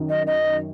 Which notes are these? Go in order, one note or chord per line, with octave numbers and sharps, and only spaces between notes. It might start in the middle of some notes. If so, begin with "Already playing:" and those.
Already playing: F#2 D#3
D#5
D#5